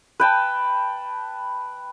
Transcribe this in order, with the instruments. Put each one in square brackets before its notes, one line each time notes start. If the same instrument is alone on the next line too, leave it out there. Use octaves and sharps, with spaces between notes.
[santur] B4 G5 A5